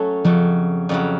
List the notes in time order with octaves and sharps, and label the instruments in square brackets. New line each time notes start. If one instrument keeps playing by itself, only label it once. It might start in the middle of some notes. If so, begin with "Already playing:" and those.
Already playing: [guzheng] F#3 A3 C#4 A4
[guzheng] F2 C#3 F#3 [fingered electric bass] F3
[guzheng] F2 C#3 F#3